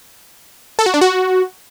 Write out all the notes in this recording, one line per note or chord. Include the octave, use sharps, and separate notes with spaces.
A4
F#4
D4
F#4